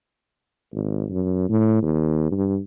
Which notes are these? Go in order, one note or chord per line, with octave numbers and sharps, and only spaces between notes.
G#1
F#2
A2
D#2
G2